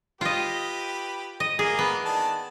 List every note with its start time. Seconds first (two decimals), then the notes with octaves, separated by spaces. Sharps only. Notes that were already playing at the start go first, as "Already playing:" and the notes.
0.21 F4 G4 B4 D#5
1.40 D#5
1.59 E3 A#3 G#4
1.79 B3
2.06 D#3 D4 A5